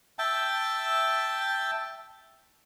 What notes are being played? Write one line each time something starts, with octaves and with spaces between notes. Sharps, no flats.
E5 G5 A5